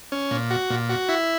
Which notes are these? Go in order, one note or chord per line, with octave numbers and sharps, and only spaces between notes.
C#4
A#2
F#4
A#2
F#4
E4